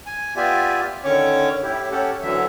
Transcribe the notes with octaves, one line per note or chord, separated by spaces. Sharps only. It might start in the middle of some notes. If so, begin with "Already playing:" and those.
G#5
B3 F4 G4 D5 E5 G#5
D3 D#3 C#4 C#5 C#6 D6
A2 E4 G4
C#4 G4 A4 F#5
D2 D3 E3 F#3 E5